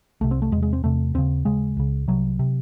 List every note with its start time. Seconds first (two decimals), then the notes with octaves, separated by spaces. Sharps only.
0.21 C2 C3 A3
0.31 C4
0.42 A3
0.52 E2 G#3
0.57 C3
0.63 G#3
0.73 C4
0.84 E2 C3 A3
1.14 D#2 C#3 C4
1.45 D#2 C#3 G#3
1.77 C#2 C#3
2.08 C2 C3 F#3
2.39 C3